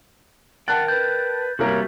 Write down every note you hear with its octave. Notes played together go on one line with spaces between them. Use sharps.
A#4 D5 F#5 G5 A5 F#6 A6
B4 G6
C2 G3 A#3 B3 F#4 A#4 C#5